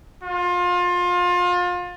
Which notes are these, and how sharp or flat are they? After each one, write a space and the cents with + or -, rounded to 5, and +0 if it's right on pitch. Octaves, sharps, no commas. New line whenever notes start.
F4 +30